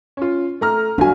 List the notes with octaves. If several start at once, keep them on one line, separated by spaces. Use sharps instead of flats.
C#4 F4
A3 A#5 F6
G1 D4 F#4 G#5